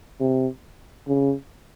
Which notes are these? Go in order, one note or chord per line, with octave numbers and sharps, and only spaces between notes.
C3
C#3